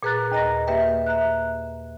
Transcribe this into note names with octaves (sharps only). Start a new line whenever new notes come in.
A#2 G#4 B4 A#5 F#6 A6
D#2 D#5 A#5 A#6
A#3 G4 B4 E5 G5
E5 A#5 F#6